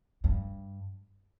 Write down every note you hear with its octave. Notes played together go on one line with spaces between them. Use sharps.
G2